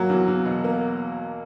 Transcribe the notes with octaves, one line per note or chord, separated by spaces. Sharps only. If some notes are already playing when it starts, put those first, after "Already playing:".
Already playing: F#3 A#3
E2
E2
B2
A#3